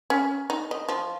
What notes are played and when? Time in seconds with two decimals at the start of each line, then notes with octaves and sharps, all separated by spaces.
0.10 C#4
0.50 D#4
0.71 D#5
0.89 F3